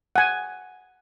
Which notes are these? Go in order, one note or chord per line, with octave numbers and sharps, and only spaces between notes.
F#5 G#5